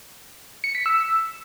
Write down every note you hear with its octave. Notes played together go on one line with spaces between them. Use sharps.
C#7
B6
E6